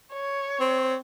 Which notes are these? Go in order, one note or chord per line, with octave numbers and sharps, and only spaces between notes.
C#5
C4